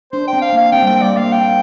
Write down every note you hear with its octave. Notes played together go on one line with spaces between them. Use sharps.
D4 C5
G5
C4
F5
A#3 F5
C4 G5
G3
A#3 G5
G3 D5
A#3 F5
G5